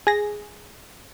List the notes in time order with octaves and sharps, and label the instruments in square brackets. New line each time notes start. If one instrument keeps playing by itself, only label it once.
[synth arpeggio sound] G#4 A#6